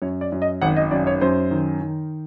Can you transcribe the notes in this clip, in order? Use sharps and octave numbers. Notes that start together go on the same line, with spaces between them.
F#2 C#5
D5
F#2
D#5
G#1 F#5
D#5
F#2 D5
C#5
F#2 C5
D#3
D#3